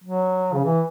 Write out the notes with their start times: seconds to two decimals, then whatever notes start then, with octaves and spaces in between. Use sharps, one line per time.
0.04 F#3
0.53 C#3
0.64 E3